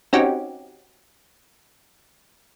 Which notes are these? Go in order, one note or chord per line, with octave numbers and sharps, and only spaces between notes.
C4 C#4 D#4 F#4 G4